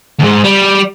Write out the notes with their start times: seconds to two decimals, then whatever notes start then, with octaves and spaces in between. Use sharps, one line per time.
0.20 D2 G#2
0.44 G3